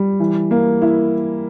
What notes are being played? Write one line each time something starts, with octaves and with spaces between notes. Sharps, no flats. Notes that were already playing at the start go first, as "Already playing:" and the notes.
Already playing: G3
E3
A#3
E4